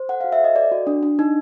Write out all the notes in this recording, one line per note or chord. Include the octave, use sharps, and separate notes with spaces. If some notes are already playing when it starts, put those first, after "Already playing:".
Already playing: C5
A4 F#5
F#4 F5
E5
A4 D#5
A4 D5
F#4
D4
D4
D#4